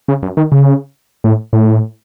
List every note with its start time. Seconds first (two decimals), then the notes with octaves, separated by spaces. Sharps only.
0.08 C#3
0.23 F#2
0.37 D#3
0.52 C#3
1.24 A2
1.53 A2